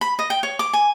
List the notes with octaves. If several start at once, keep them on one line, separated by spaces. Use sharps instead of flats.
B5
D#5
G5
C#5
D6
G#5